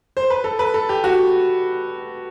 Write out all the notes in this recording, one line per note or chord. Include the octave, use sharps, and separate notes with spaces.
C5
B4
A4
B4
A4
G4
F#4